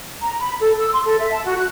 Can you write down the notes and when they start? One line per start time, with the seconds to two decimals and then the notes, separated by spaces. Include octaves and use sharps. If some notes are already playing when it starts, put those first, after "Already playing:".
0.21 A#5
0.39 B5
0.61 A4
0.78 E6
0.93 C6
1.05 A4
1.18 E5
1.33 A5
1.45 F#4
1.57 F#6